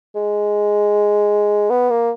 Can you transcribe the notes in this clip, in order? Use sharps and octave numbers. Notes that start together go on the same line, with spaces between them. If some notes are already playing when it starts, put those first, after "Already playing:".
G#3
B3
A#3